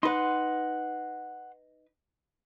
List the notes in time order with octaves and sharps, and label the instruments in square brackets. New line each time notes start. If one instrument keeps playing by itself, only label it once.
[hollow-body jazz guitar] D#4 B4 [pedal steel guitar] F#5 C6